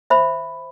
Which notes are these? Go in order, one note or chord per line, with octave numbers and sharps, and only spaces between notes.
C5 E5 B5